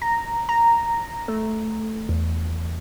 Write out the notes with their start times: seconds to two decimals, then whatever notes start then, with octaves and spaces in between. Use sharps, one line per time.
0.02 A#5
0.49 A#5
1.28 A3
2.09 E2